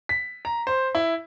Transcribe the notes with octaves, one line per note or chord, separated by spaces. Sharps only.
B6
A#5
C5
E4